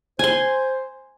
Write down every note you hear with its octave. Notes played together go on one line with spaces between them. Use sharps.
C5 G#5 C6